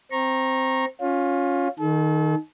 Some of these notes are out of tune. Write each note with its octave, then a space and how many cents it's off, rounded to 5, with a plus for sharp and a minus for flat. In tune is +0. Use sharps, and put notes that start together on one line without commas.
C4 +0 A#5 +0 C#6 -30
C#4 +0 F4 +20
D#3 +0 A4 -40